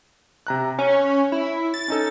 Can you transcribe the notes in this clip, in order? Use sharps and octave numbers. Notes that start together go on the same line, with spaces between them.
C3 A#5 F#6
C#4 C#5
E4
A6
C#4 D#4 A4